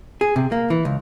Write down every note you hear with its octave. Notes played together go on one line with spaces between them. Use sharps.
G#4
C3
A#3
E3
C#2